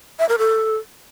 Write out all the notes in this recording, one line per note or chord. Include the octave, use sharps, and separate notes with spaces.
E5
A#4
A4